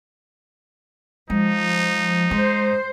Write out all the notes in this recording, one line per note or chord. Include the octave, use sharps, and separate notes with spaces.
F3 G#3 D#4
G#3 C5